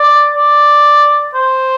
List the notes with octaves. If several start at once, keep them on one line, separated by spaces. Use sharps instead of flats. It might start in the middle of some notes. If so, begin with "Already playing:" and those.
Already playing: D5
D5
C5